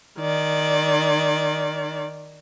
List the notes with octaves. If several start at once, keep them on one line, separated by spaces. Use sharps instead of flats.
D#3 D5